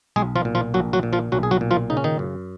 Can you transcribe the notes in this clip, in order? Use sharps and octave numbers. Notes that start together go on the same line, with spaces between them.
B1 G#3 G#4
F3 F4
A#2
F3 F4
A#1 F#3 F#4
F#3 F#4
A#2
F3 F4
B1 F#3 F#4
G#4
F#3 F#4
A#2
F3 F4
C#3 D#4
C#4
D#3 D#4
F#2